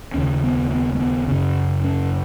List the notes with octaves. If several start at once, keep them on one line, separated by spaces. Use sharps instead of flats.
D#2 C#3 C#4
B3
B3
A3
B3
F#2 C#3 C#4
C#4